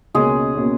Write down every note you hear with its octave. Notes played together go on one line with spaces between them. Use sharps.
C#2 B2 G#3 A#3 C#4 G#4
B2 A#3 C#4